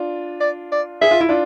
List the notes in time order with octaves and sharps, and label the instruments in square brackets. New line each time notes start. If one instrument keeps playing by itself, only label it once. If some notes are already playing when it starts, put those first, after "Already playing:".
Already playing: [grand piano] D4 F4
[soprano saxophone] D5
D5
[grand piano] G#4 [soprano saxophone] E5
[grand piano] F4
E4
D4 F4